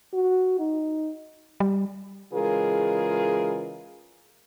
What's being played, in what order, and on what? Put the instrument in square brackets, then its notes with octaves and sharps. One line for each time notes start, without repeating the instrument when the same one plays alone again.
[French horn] F#4
D#4
[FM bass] G3
[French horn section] C#3 E3 G#3 F4 G#4 A#4